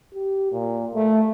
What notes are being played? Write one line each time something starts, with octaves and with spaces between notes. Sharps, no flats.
G4
A#2
A3